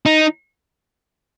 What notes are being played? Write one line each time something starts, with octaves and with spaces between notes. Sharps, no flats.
D#4